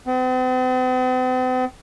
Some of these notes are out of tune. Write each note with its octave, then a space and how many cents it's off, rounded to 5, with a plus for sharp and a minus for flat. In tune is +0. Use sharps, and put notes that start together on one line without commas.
C4 -45